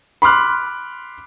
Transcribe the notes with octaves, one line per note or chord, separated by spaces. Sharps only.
B5 C6 D6 F6 F#6